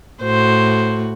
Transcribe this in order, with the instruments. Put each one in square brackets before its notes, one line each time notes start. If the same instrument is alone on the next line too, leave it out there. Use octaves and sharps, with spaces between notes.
[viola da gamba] A2 F#4 [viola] C5